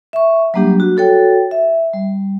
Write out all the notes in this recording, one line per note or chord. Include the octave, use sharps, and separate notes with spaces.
E5 C#6
F#3 G3 A#3 D4 G4
F#4
F#4 A4 C#5 G5
E5
G3